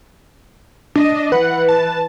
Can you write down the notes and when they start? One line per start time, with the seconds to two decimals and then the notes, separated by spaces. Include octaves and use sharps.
0.96 D4 D#5
1.32 E3 B4 F#5
1.69 A5